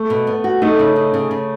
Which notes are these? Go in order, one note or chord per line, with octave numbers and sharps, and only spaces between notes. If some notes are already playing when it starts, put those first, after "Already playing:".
Already playing: A3
B2
B3
F#4
A3 D#4
C#3
D#4
C#3
C#3